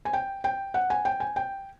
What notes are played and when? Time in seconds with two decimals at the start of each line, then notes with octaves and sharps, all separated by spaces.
0.05 G#5
0.13 G5
0.44 G5
0.74 F#5
0.90 G#5
1.05 G5
1.20 G#5
1.36 G5